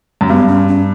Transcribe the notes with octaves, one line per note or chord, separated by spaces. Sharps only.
F#2
G2 B3
C#4
C#4